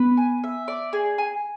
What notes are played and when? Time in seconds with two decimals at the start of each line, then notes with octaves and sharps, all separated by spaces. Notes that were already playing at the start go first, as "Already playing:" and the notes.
Already playing: B3 B4
0.17 G#5
0.44 E5
0.68 D5
0.93 G#4
1.18 G#5